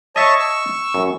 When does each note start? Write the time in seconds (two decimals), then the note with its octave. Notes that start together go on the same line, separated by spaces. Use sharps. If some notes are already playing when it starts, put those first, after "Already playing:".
0.16 C#5 D#5 E5 A5 C#6
0.40 C#6 E6
0.94 F#2